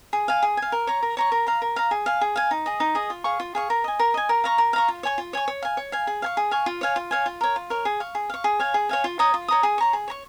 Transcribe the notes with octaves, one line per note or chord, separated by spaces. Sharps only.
G#4
F5 G#5
G#4
F5 G#5
A#4
C#5 A#5 C#6
A#4
C#5 A#5 C#6
A#4
F5 A#5
A#4
F5 A#5
G#4
F5 G#5
G#4
F5 G#5
D#4
G#4 D#5
D#4
G#4 D#5
F4
G#4 F5 C#6
F4
G#4 F5 C#6
A#4
D#5 G#5
A#4
D#5 G#5
A#4
F5 A#5 C#6
A#4
F5 A#5 C#6
F4
C#5 G#5 C#6
F4
C#5 G#5 C#6
C#5
F5 G#5
C#5
F5 G#5
G#4
F5 G#5 C#6
G#4
F5 G#5 C#6
F4
C#5 F5 G#5
F4
C#5 F5 G#5
F4
A#4 C#5
F4
A#4 C#5
G#4
F5 C#6
G#4
F5 C#6
G#4
C#5 F5 G#5
G#4
C#5 F5 G#5
F4
C#5 A#5 D#6
F4
C#5 A#5 D#6
G#4
C#5 A#5 C#6
G#4
C#5 A#5 C#6